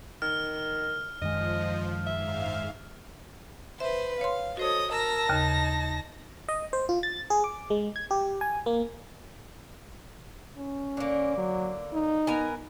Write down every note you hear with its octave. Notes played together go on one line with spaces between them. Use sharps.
D#3 F6
F#2 D#3 F3 G#3 D#5
G#2 E5 F5
B4 C5 E5
C#5 F5 C6
F#4 A4 C5 C#5 D#5 D#6
A#4 A5 A#5 E6 A#6
D#2 C#3 D#4
D#5
C5
F4
A6
G#4
D6
G#3
G#6
G4
G#5
A#3
C#4
D3 A#3
F#3
D#4
B3 A#4 G#5